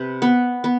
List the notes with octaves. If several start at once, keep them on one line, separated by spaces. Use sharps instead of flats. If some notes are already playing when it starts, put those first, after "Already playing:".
Already playing: C3 B4
B3
B3